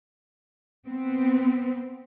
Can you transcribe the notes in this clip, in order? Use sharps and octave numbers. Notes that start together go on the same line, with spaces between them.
B3 C4